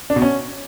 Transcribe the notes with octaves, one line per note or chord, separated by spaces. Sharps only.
D4
B2
C#4